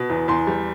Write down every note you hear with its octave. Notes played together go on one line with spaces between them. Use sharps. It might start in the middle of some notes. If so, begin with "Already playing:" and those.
Already playing: B2
E2
E2 C6
G3